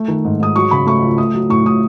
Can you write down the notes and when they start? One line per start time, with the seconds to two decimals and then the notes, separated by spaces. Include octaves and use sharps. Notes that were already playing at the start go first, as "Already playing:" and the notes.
Already playing: A3
0.08 D#3
0.25 G#2
0.40 G#2 D#6
0.56 F#3 C#6
0.71 C#3 B5
0.87 A3 C#6
1.02 C#2
1.18 A3 D#6
1.35 F#3
1.49 A2 C#6
1.65 A2 D#6